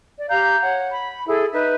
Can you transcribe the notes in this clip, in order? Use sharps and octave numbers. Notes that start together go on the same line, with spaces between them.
D5
G4 F5 A#5 G6
C#5 F#5
B5
E4 G#4 A4
D#4 B4 E5